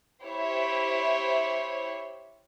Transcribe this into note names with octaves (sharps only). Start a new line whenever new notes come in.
E4 G4 C5 C#5 E5